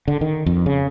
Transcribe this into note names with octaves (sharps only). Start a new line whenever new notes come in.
D3
D#3
F2
C#3